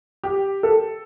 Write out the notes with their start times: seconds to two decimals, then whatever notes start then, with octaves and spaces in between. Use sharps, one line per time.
0.24 G4
0.63 A4